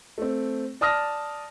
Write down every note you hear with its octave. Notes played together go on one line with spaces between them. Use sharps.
A3 C4
D5 A5 D#6 F6 A#6